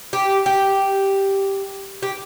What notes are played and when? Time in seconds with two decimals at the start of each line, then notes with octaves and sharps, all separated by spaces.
0.13 G4
0.46 G4
2.03 G4